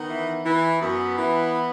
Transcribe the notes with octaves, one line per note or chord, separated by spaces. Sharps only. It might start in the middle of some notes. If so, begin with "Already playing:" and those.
Already playing: D#3 B3
E3
E3
F#2 B3
E3